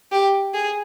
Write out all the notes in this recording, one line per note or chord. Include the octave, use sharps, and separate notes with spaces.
G4
G#4